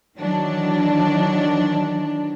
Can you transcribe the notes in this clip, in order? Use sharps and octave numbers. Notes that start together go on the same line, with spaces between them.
D#3 E3 F#3 D4